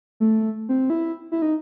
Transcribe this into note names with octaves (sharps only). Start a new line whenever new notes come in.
A3
C4
E4
E4
D#4